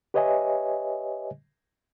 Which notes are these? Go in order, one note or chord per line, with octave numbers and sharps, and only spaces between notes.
G4 B4 C#5 D#5 E5 G#5